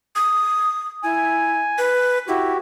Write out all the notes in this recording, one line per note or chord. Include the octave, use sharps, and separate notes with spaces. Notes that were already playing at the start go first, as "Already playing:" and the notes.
D#6
E4 G#5
B4
E4 F#4 G4